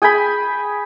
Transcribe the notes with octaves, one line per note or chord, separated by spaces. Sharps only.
G#4 G5 G#5 B5